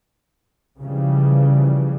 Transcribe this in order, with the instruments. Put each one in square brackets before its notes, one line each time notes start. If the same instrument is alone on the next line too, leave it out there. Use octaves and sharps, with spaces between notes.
[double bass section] C#3 E3 F3 G3